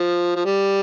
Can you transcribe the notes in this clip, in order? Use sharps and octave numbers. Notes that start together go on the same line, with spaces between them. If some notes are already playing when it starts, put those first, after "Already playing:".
Already playing: F3
F3
G3